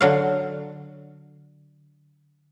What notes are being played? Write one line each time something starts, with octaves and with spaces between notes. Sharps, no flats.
D3 F#3 F5